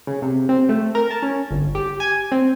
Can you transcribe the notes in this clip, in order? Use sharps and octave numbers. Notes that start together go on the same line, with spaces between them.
C#3
C3
C4
A3
A#4
A5
C#4
G1
G4
G#5
C4